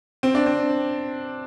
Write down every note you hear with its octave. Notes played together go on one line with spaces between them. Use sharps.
C4
D4
C4